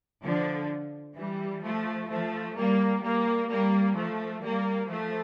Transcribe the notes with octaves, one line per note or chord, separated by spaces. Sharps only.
D3 F3
E3 G3
F3 A3
F3 A3
G3 A#3
G3 A#3
G3 A#3
F3 A3
G3 A#3
F3 A3